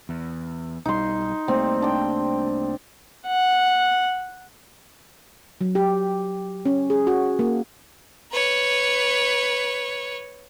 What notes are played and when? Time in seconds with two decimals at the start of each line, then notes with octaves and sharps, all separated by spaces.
0.09 E2
0.85 B1 G3 D#4 C6
1.48 C2 G3 A3 A#3 C4
1.82 D4 G5
3.27 F#5
5.61 F#3
5.75 G4
6.66 C#4
6.90 G#4
7.07 F#4
7.39 A#3
8.32 B4 C#5